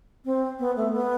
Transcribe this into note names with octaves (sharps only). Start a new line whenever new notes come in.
C4
B3
A3
B3